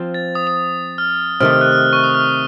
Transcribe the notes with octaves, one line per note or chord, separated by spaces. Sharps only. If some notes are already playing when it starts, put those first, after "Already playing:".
Already playing: F3 C4 F4
A6
D#6
D#6
F6
C3 D#3 A3 F6
F6
F#6
F6
F6
C#6
D#6
F6